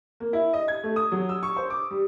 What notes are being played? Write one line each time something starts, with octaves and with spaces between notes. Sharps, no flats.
A#3
E4
D#5
G#6
A3
D#6
F#3
E6
C#6
C5
D6
G3